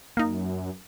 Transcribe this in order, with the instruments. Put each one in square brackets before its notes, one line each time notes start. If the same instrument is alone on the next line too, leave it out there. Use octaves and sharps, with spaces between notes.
[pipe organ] F#2 [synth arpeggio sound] A#3 D#4